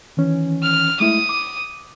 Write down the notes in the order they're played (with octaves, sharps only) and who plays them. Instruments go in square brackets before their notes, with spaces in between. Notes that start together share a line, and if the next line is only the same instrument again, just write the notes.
[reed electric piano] D#3 E3 C#4
[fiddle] F6
[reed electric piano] G#3 A3 E4 [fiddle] D#6
[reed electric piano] D6